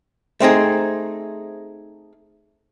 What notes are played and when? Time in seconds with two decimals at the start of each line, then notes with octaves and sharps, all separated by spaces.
0.40 A3 C4 D#4 G#4